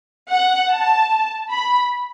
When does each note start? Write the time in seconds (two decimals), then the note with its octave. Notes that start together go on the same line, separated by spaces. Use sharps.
0.30 F#5
0.71 A5
1.49 B5